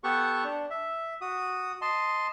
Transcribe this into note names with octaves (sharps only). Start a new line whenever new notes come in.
B3 G4 A4 F#5 C#6
D4
E5
F#4 D#6
D#5 A5 C6